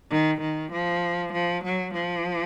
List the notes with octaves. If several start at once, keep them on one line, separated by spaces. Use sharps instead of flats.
D#3
D#3
F3
F3
F#3
F3